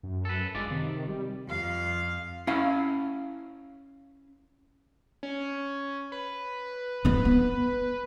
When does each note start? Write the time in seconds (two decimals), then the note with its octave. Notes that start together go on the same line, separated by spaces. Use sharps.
0.03 F#2
0.25 A4 B4
0.55 G1 G#3 F4 D5
0.70 C3 D#3
1.08 G3
1.47 F2 F5
2.47 C#4 E4 F5
5.23 C#4
6.12 B4
7.05 F3 B3
7.25 B3